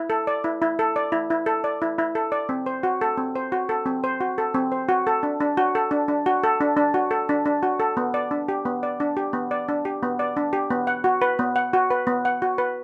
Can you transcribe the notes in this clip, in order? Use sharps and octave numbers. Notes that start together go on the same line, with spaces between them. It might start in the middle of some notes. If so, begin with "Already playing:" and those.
Already playing: E4
A4
D5
E4
E4
A4
D5
E4
E4
A4
D5
E4
E4
A4
D5
C4
C5
F#4
A4
C4
C5
F#4
A4
C4
C5
F#4
A4
C4
C5
F#4
A4
D4
D4
F#4
A4
D4
D4
F#4
A4
D4
D4
F#4
A4
D4
D4
F#4
A4
B3
D5
D4
G4
B3
D5
D4
G4
B3
D5
D4
G4
B3
D5
D4
G4
B3
F#5
F#4
B4
B3
F#5
F#4
B4
B3
F#5
F#4
B4